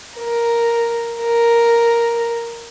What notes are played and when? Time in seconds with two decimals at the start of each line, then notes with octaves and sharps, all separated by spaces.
0.18 A#4
1.21 A#4